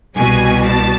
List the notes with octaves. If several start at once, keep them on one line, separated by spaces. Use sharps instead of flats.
C2 B2 G3 G#5
A5